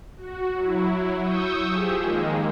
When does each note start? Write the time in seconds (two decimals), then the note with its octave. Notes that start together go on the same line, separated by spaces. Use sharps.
0.17 F#4
0.52 F#3 E4
1.19 C#6 D#6 E6 G6
1.70 F3 G4 G#4
2.00 D#3 G#3 A#3